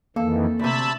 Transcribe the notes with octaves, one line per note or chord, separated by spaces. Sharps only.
F2 D#3 E3 A#3 A4
D2 C3 E5 A5 B5